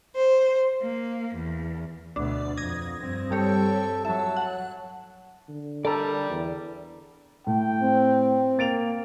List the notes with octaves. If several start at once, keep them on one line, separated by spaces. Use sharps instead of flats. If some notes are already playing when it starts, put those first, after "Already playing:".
C5
A#3
E2
D2 B2 D4
F2 D#6 G#6 A#6
G2 C4
G3 G4 A4 C#5
F#3 E5 A5
F#5
D3
G3 A4 A#4 D5 A5 A#5
E2
A2 G5
C4
A#3 A6 D7 F7